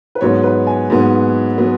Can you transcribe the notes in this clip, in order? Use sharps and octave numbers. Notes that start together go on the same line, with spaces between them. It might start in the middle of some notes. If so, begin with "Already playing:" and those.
B4
G#2 F#3 B3 C#5
B4
G#5
G#2 F#3 B3
F#3 B3